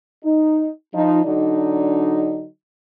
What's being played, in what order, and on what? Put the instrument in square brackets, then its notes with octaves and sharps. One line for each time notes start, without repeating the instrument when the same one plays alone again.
[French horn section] D#4
F3 D#4
D3 F#3 D4 D#4